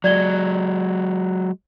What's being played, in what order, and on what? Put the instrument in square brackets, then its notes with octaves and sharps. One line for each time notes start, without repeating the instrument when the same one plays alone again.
[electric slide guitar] F#3 G#3 [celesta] D5 G#6 G7